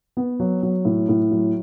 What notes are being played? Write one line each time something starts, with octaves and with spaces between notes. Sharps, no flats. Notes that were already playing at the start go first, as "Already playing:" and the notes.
B3
F#3
F#3
A2
A2
F#3